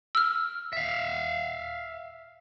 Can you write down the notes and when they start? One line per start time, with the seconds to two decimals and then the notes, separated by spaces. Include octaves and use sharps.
0.15 E6 F6
0.73 E5 F5